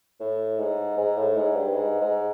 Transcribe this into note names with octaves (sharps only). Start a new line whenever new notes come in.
A2
G#2
G#2
A2
G#2
G2
G#2
G#2